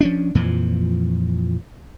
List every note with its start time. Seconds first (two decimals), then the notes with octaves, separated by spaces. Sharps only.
0.01 F3 C#4 D4
0.35 F2 A#2 E3 F3